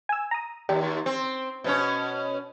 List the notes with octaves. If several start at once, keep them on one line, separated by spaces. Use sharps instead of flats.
G#5 E6
A#5 D#6
D#2 D4 D#4 G4
C4
B2 C#4 C#5